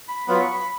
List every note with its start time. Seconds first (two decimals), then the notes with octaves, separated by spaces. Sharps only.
0.08 B5
0.27 F#3 B3 F4 B5
0.40 C#6
0.53 B5